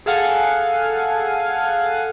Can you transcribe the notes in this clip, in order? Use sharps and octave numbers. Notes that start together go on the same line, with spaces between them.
G#4 A4 F5 F#5 G#5